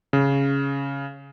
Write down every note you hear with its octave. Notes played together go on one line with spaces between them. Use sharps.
C#3